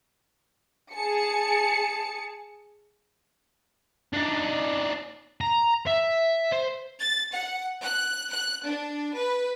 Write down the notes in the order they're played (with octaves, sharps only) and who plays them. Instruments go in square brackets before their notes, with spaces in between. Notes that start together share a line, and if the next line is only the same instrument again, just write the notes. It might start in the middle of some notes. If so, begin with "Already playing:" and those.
[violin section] G#4 A5 C#7
[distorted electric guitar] D4 D#4
A#5
E5
C5
[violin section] A6
F#5
F#6
F#6
D4
B4